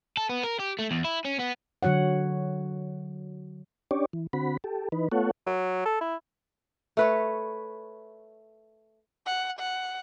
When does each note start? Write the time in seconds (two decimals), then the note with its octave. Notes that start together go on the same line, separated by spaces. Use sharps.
0.17 A4
0.29 B3
0.44 A#4
0.60 G4
0.79 A3
0.91 E2
1.04 E4
1.25 C#4
1.39 B3
1.83 D3 F#3 F#4 C#5 F#5
3.91 C#4 D4 G4 C#5 D5
4.13 E3
4.33 D3 C4 F#4 B5
4.64 G4 A4
4.92 E3 D#4 B4
5.12 A3 B3 F4 A4 C#5 F#5
5.47 F#3
5.86 A4
6.01 E4
6.97 A3 B4 C#5
9.26 F#5
9.59 F#5